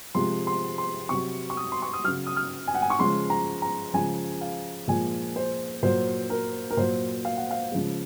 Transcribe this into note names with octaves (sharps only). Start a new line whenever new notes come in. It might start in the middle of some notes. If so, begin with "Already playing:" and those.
C3 F3 G#3 C6
C6
C6
C3 F#3 C#6
C#6
D#6
C6
C#6
D#6
C#3 F#3 F6
D#6
F6
G#5
F#5
G#5
C#6
C#3 F3 G#3 C6
A#5
A#5
C#3 F3 G#3 G#5
F5
A#2 F3 G#3 G#5
C5
A#2 F#3 C5
A#4
A#4
A#2 F#3 C5
F5
F#5
F5
C#3 F3 G#3